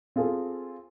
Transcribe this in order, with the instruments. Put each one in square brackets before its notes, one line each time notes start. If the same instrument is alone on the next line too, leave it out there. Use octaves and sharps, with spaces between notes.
[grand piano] C4 F4 G#4 A4